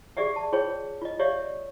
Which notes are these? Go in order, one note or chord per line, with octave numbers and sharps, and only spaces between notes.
G4 G#4 D5 E5 F#5
A5
F4 G#4 C5 C#5 G5
F4 D#5
G4 C#5 D5 E5 F5